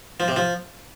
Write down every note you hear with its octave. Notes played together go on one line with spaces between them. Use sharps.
F3
C3
F3